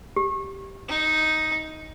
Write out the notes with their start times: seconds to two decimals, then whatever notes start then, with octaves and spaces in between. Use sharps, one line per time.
0.16 G4
0.89 D#4